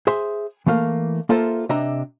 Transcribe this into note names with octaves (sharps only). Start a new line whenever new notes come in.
G#4 C5 E5 C6
E3 A3 A#3 F5
A#3 F4 A4 C5 E5
C3 D4 D#5 E5 A#5